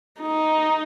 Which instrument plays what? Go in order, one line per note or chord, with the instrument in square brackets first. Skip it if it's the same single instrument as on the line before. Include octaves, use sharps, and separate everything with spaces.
[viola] D#4